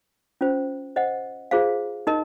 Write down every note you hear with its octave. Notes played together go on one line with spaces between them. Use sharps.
C#4 F4 C5
C5 D#5 F#5
F4 G#4 C5 F5
D#4 A#4 D#5